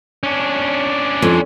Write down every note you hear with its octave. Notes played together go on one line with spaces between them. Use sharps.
C#4 D4
F2